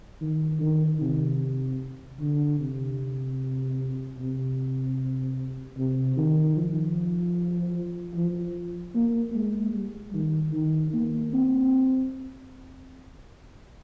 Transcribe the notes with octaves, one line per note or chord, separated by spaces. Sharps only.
D#3
D#3
C3
D3
C3
C3
C3
D#3
F3
F3
A#3
G#3
G3
D#3
D#3
A#3
C4